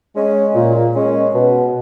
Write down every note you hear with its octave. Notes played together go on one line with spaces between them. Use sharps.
G#3 C#4
A#2
G#3 C#4
B2